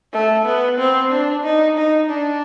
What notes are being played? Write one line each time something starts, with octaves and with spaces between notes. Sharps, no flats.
A3
B3
C4
D4
D#4
D#4
D4